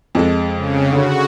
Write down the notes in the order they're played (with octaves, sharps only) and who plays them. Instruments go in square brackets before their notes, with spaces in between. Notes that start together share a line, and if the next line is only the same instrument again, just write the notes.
[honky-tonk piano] F2 G#3 A4
[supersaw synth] C#3
[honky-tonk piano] D3 [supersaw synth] F#4